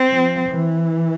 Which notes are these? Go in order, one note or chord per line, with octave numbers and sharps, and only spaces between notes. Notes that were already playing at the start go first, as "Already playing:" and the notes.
Already playing: C4
F3
E3